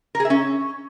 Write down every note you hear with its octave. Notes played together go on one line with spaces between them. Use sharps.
A#4
G#4
E5
C#4